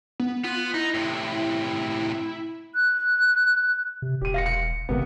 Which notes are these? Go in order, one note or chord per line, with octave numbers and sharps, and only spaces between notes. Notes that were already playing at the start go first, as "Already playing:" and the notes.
B3
B3 F4
D#4 E4
A2 C3
F#6
C3
E1 G4 D#7
F5 A#6 C#7
C#7
G#1 C3 A#3 B3